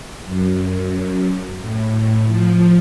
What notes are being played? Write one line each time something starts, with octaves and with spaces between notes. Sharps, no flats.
F#2
A2
F3